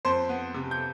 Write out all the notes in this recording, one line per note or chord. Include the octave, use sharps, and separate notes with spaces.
F2 C5 C6
B3
C3
G6